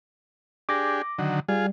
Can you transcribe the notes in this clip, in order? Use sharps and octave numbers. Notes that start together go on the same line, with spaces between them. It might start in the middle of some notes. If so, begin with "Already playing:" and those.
D4 G4 G#4 D6 A#6
D3 D#3 F#3
G3 F4 G#4